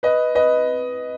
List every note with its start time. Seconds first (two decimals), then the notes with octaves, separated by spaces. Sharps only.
0.03 B4 D#5
0.35 B4 D#5